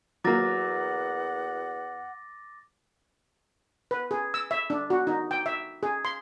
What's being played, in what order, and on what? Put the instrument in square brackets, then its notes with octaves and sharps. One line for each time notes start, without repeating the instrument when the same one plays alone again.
[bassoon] E2 [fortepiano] F#3 A#3 [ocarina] F#5 [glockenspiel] D6 A6 A#6
[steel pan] B4
G#4
E6
E5
D4
F#4
D#4
G5
E5
G#4
C6